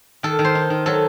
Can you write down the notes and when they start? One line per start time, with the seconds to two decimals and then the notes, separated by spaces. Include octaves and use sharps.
0.23 D#3 A4
0.39 D#3
0.45 C5
0.55 D#4
0.70 D#3
0.86 F#3 A4